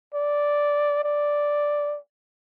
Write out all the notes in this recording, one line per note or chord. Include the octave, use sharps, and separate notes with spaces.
D5
D5